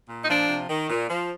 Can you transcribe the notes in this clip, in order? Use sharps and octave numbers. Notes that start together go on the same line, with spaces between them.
A#2
D#4
F3 D4
C3
D#3
A#2
F3